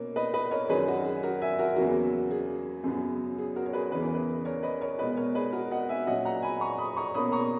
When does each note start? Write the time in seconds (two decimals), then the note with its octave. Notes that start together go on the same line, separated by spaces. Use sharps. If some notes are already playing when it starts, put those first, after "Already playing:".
Already playing: B2 A#3 C#4
0.16 B4 D#5
0.34 B4 D#5
0.51 A#4 C#5
0.69 F#2 D#3 F#3 C#4 G#4 B4
0.88 F#4
1.05 G#4
1.23 F#4 A#4
1.42 E5 G#5
1.59 F#4 A#4
1.76 E2 C#3 F#3 A#3 F#4
2.31 G#4
2.84 F#2 C#3 F#3 B3
3.38 G#4
3.56 F#4 A#4
3.66 C#5
3.73 G#4 B4
3.92 E2 C#3 E3 B3 B4
4.02 A#4
4.14 G#4 B4
4.45 A#4 C#5
4.63 B4 D#5
4.81 A#4 C#5
4.99 B2 G#3 B3 B4 D#5
5.17 A#4 C#5
5.35 G#4 B4
5.52 F#4 A#4
5.71 D#5 F#5
5.89 E5 G#5
6.07 A#2 F#3 C#4 D#5 F#5
6.25 F#5 A#5
6.42 G#5 B5
6.61 A#5 C#6
6.78 B5 D#6
6.97 A#5 C#6
7.14 B2 A#3 C#4 B5 D#6
7.32 A#5 C#6